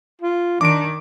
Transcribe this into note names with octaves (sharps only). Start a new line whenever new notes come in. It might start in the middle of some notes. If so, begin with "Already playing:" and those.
F4
D#3 D4 D6 D7